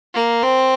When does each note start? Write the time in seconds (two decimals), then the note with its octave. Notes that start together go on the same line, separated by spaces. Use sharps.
0.14 A#3
0.43 C4